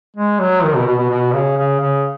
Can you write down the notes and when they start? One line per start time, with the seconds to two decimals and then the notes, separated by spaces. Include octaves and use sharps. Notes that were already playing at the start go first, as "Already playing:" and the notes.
0.16 G#3
0.39 F#3
0.63 D#3
0.75 B2
0.86 B2
0.98 B2
1.10 B2
1.33 C#3
1.56 C#3
1.79 C#3